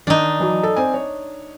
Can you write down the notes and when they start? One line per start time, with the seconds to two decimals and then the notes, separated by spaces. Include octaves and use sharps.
0.07 D#3 D4 D#4
0.40 E3 F#3
0.63 A4
0.76 C4 C5 G#5
0.94 C#5